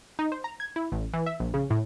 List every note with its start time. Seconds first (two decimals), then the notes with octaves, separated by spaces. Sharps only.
0.19 D#4
0.32 C5
0.44 A#5
0.60 G#6
0.76 E4
0.92 A1
1.13 E3
1.26 E5
1.40 A#1
1.54 C#3
1.70 A2